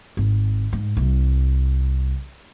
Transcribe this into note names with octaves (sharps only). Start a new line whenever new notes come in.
G#1
G#2
C2